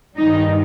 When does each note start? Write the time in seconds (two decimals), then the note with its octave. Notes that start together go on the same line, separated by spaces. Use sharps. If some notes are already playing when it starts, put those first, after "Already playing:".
0.18 G2 D#3 G3 D#4